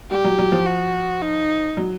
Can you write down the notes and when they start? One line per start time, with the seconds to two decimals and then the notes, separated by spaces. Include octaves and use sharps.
0.11 G3 G4
0.24 F#3
0.38 F#3
0.52 F3
0.66 F#4
1.22 D#4
1.77 F#3